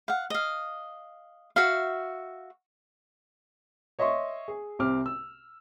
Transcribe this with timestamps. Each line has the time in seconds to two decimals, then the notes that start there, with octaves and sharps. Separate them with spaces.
0.08 F5 F#5
0.30 D#5 F5
1.56 F#4 E5 F5
3.99 C#5 D#5 E5 C6 C#6
4.48 G#4
4.79 C2 C3 C4 D6 F6
5.06 E6